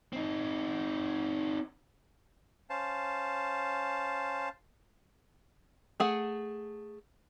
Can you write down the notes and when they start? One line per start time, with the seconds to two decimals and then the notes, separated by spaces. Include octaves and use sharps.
0.13 C4 D#4
2.70 C#4 C5 F5 A5
6.00 A3 G#4 F#5